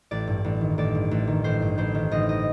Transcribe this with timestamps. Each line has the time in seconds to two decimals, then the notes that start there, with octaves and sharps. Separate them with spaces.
0.11 A1 D5
0.28 G2
0.44 A1
0.61 D#3
0.78 A1 D5
0.95 G2
1.11 A1
1.28 D#3
1.44 A1 C5
1.62 G2
1.78 A1 C5
1.95 D#3
2.11 A1 D#5
2.29 D#5